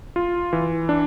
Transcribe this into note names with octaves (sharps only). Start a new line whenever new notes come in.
F4
E3
D4